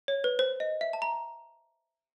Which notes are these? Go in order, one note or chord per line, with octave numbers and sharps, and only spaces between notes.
C#5
B4
C5
D#5
E5
A5
A#5